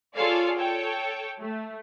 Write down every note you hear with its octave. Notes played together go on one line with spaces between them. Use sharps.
F4 G#4 A4 C#5 D5 F5
A4 C#5 G5
A3